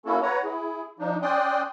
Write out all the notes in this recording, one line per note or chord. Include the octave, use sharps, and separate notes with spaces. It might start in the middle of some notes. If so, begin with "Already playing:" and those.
A#3 C#4 E4 F#4 A4
B4 C#5 F#5 A#5
E4 G#4
F3 D4 D#4
C#4 D5 G5 C6 D#6 F#6